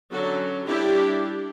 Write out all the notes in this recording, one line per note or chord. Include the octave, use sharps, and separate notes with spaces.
D3 F#3 C#4 F#4 A4
G3 D4 E4 G4